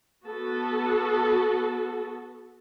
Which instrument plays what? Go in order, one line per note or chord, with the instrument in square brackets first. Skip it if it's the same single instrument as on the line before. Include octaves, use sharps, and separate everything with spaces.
[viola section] B3 F#4 A4